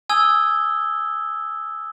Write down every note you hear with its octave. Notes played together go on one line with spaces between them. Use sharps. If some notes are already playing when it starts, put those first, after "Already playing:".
G#5 D#6 E6 G#6 G7